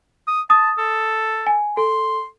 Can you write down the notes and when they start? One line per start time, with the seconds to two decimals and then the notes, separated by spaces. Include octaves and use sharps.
0.27 D#6
0.50 A5 D#6
0.78 A4
1.47 G#5
1.77 A4 C6